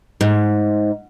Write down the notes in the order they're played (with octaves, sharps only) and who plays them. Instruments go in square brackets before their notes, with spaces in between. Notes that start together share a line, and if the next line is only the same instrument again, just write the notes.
[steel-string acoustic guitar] G#2